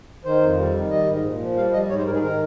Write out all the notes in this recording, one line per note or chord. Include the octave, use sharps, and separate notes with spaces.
D#3 C5
F2
G3
D#3
G3 D#5
G#2
A#2
F3
G3 F5
G3 D#5
G#2 C#5
C5
G#2 A#4
G#4
D#3 A#4